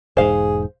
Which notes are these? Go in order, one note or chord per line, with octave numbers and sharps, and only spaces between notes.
E1 G#2 G#4 C5 F5